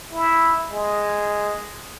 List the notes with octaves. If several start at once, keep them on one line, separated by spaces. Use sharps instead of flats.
E4
G#3